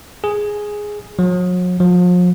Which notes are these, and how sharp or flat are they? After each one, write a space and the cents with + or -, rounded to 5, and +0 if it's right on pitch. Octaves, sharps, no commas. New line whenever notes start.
G#4 +0
F#3 -40
F3 +40